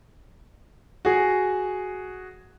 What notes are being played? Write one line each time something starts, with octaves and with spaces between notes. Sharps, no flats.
F#4 G#4